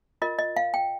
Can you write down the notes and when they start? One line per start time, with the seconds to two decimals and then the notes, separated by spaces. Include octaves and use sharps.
0.22 F4 A#4 D#5
0.39 D#5
0.56 F5
0.74 G5